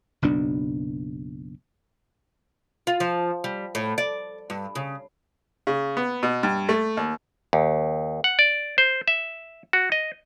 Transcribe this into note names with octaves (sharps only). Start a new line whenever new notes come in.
F#1 B1 B2 D4
F4
F3
G3
A2
D5
G2
C#3
C#3
B3
B2
G2
A3
D#2
D#2
F#5
D5
C5
E5
F#4
D#5